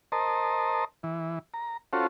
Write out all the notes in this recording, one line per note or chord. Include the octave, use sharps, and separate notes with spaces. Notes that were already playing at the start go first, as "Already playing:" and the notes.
A#4 C5 D#5 A5
E3
A#5
C#4 F4 F#4 A4 C5